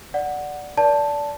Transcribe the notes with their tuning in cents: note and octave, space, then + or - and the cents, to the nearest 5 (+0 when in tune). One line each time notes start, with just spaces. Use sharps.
D5 +0 F#5 +0
A#4 +35 D5 -20 A5 +0